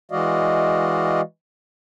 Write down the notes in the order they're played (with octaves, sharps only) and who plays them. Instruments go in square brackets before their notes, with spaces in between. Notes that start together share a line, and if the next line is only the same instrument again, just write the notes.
[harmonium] E3 G#3 F#4 D5 D#5 F5